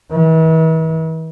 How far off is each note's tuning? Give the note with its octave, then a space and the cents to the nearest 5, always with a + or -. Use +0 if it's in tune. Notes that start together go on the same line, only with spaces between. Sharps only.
E3 -40